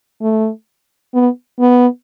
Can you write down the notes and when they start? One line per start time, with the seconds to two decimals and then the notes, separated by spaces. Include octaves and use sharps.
0.21 A3
1.14 B3
1.60 B3